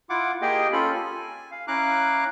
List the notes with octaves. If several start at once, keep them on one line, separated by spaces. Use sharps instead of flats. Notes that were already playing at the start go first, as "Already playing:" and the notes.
E4 F4 F#5 D6
A#3 G4 G#4 D#5 G5
C#4 F4 A4 B5
G#5
F5
C#4 E4 F5 A#5 D6 F#6